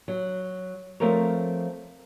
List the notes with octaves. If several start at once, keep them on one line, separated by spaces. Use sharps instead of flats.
F#3
F3 A3 C4 A#4 C#5